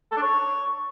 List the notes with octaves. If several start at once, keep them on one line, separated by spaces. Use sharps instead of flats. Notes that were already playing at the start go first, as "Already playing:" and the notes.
A4
D4
C#5